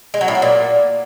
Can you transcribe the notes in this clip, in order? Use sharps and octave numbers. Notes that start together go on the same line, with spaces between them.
G#3
F#3
A2
F#3
A#2